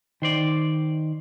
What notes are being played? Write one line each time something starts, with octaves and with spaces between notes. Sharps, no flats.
D#3 C5 D5